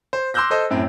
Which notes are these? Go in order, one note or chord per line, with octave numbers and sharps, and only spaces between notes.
C5
C6 D6 E6 F#6 G6 A#6
A4 C5 D#5
F#2 A2 C4